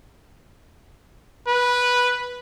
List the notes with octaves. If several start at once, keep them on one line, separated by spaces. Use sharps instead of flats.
B4